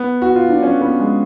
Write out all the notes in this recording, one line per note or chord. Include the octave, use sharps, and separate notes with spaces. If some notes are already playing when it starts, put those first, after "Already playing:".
Already playing: B3
F#4
F4
D4
C#4
B3
G#3